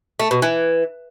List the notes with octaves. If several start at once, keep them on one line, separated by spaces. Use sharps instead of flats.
A3
B2
E3